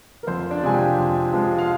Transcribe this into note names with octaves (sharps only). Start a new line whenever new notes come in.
A#4
F2 C5
D4 D5
C3 F3 G#3 G#5
G4 G5
F2
C3 F3 G#3
F5